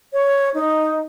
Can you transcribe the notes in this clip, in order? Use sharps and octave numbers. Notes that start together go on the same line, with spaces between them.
C#5
D#4